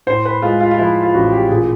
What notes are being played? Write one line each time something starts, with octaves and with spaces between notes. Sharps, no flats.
A2 C5
B4
G#3 F4
F4
F4
F3 E4
F4
A1 F#4
G4
A#2 G#4